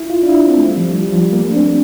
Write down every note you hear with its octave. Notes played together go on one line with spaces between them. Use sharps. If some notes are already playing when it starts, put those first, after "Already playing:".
Already playing: E4
F4
D4
E4
C4
A3
G3
F3
G3
G3
F3
G3
A#3
A3
D4
C4